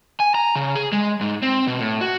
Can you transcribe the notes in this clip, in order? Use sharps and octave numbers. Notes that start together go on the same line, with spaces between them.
G#5
A#5
C#3
G#4
G#3
G#2
C4
B2
A2
F#4